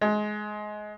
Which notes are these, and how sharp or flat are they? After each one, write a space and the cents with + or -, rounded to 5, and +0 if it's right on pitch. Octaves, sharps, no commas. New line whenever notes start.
G#3 +20